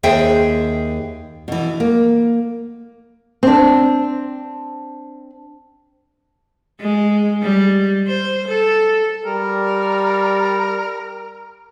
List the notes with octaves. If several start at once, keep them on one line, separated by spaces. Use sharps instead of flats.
D#2 G#4 C5 E5 G5
B2 E3
A#3
C4 D4
G#3
G3
C5
A4
G3 A#4